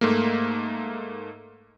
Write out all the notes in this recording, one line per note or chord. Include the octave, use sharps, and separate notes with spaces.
G#2 A3 A#3